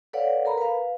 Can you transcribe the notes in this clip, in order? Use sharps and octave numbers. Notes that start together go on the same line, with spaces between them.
A4 B4 C#5 D5 F5 F#5
A4 A#4 A#5 B5
B4 F5